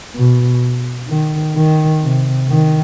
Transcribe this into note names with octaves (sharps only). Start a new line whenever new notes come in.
B2
D#3
D#3
C3
D#3